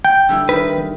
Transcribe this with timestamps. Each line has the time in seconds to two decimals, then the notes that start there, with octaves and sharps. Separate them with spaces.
0.04 G5
0.29 D3 G3 E4
0.49 D#3 B4